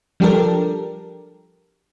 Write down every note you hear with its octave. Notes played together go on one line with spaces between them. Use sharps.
F3 G3 D4 G4 A4 A#4